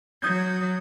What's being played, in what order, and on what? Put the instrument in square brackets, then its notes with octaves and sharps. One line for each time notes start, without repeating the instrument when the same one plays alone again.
[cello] F#3 [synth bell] D#6 G6 G#6